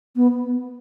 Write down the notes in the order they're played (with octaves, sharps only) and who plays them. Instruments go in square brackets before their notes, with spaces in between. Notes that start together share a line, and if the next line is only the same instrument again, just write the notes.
[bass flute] B3